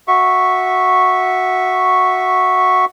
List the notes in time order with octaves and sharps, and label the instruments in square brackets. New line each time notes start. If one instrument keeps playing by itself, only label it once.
[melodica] F#4 E5 C#6